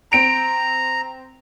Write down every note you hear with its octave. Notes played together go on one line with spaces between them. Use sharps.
C4 A#5 D7 F7